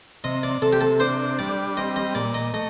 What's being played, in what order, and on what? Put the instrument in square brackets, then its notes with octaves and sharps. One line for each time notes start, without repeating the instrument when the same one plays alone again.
[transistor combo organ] C3 [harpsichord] D#5
[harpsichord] D5
[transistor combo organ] C3 [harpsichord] A4
[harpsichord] G4
A4
[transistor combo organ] D4 [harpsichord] C5
[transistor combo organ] G3 [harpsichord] D5
[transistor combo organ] C4 [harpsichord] D#5
[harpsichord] D#5
[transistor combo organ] A#2 [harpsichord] D5
[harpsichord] D#5
[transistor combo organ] A3 [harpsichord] D#5